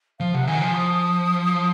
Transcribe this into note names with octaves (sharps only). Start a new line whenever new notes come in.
F3 F5
C3 F#5
D#3 G#5
F3 G#5
D#6